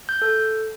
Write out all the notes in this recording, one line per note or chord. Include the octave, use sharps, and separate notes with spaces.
G6
A4